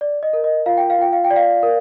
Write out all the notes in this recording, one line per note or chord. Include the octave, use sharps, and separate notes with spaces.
D5
D#5
A#4
D#5
F4 F5
G5
F5
F4 G5
F5
G5
D5
F5
A#4